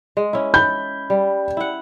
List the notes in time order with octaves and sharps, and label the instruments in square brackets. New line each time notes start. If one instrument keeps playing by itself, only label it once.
[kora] G#3
C#4 E4
[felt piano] B5 G6
[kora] G3
E4 F#5